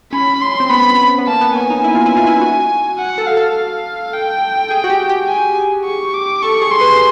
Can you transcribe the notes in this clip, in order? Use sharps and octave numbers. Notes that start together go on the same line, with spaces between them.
C#4 B5
C6
C4
B3 B5
B3
A#3 A5
B3
C#4 G#5
D#4
E4
F4
E4
F4
E4
F#4
F#5
A4
F5
A4
F5
G5
G#4
F#4
G4
G4
G#5
C#6
D6
A4 C#6
G#4
C6
B4